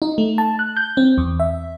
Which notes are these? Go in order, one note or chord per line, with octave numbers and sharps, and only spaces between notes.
D#4
A3
A5
F#6
G6
C4
E2
E5